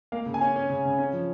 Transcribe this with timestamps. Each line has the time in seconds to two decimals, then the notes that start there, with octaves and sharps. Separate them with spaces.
0.12 A#3 F5
0.26 C#3
0.34 G#5
0.41 C#4
0.56 C#4
0.70 C#3
0.85 C#3
0.98 C#4
1.13 F3